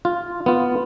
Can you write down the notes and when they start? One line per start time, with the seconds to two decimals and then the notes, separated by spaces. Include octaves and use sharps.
0.05 F4
0.46 B3 F4